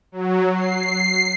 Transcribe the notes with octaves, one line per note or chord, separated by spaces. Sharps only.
F#3
C7